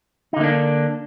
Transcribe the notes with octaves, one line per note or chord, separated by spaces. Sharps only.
D3 A#3 D4 D#4